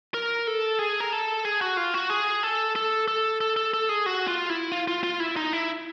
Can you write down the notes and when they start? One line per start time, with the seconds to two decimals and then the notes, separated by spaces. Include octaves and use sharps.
0.14 A#4
0.47 A4
0.79 G#4
1.00 A#4
1.13 A4
1.45 G#4
1.61 F#4
1.77 F4
1.94 F#4
2.10 G#4
2.43 A4
2.76 A4
3.08 A4
3.41 A4
3.57 A4
3.74 A4
3.89 G#4
4.06 F#4
4.27 F4
4.50 E4
4.72 F4
4.88 F4
5.03 F4
5.20 E4
5.36 D#4
5.53 E4